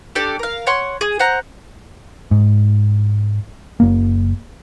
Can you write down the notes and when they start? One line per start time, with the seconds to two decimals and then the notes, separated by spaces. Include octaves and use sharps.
0.15 D4 G4 A4 D5
0.39 A#4 F5
0.67 C#5 F#5 C6
1.01 G#4
1.19 C5 F#5 A#5
2.31 G#2
3.80 F#1 A#3